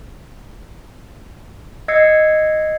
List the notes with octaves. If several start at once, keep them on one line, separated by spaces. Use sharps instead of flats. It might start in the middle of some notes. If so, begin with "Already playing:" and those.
D#5 E6 G#6 C7 C#7